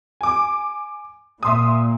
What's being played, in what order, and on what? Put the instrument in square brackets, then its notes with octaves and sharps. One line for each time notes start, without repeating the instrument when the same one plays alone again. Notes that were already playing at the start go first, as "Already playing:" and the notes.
[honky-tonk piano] G#5 D6
[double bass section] A#2 [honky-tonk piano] E5 C6 D#6